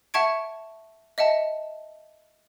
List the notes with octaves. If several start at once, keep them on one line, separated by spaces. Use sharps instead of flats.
E5 F#5 A5 C#6 G#6 D7
D#5 E5 F#5 A5